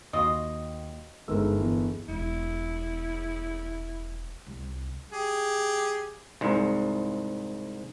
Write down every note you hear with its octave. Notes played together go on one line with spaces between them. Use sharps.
D#2 F4 F#4 D#5
G1 G#2 A#4 E6
E2
E1 E4
C2
G4 G#4
C2 G#2